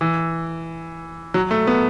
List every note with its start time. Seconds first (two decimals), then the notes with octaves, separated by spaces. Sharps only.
0.01 E3
1.34 F#3
1.51 A3
1.67 B3